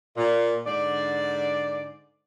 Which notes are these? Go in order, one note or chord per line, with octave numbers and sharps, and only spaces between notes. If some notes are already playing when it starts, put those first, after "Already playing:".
A#2
G#2 D3 D5